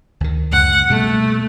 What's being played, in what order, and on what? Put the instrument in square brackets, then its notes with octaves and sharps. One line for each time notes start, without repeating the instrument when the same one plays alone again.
[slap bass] D2 D#3
[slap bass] C#2 F#2 [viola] F#5
[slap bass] B2 G3 A#3 [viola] A3